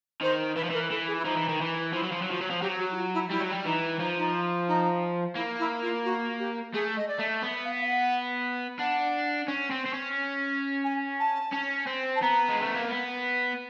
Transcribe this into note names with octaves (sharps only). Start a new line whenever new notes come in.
D#3 C5
E3 B4
F3
E3 A#4
E3 A4
G#4
E4
F3 D#4
E3
D#3
E3
F3 E4
F#3
F3
F#3
F3 F#4
F#3
F3
F#3 G4
F#4
E4
F4
E4
G3 E4
F#3
G3
E3 D#4
F3 D#4
D#4
D#4
A#3 E4
E4
F4
F#4
G4
A3 G#4
D#5
D5
A3
B3 E5
F5
F5
F#5
D4 F#5
C#4
C4
C4
C#4
G#5
A5
C#4
C4
A5
B3 A#5
G#3
A3
A#3
B3